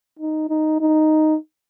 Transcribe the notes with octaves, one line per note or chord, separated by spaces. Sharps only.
D#4
D#4
D#4